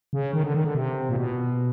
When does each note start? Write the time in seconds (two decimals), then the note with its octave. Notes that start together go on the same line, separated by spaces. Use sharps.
0.13 C#3
0.33 D#3
0.44 D3
0.54 D#3
0.64 D3
0.75 C3
1.09 A#2
1.16 B2